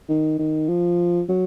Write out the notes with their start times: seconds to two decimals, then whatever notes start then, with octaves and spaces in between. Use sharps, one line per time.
0.09 D#3
0.39 D#3
0.69 F3
1.29 F#3